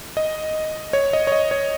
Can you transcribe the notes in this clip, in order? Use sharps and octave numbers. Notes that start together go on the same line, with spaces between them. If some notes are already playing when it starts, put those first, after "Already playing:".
D#5
C#5
D#5
C#5
D#5
C#5